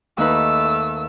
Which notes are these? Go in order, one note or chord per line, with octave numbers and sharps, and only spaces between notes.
D#2 A3 D#4 B4 E6